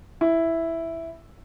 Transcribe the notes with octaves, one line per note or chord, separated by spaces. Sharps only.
E4